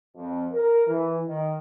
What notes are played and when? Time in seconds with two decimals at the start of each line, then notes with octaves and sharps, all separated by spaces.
0.16 F2
0.53 A#4
0.86 E3
1.27 D#3